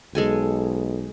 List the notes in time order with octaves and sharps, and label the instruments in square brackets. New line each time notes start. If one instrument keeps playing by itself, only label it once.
[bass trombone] B1 [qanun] G#3 A4 G#5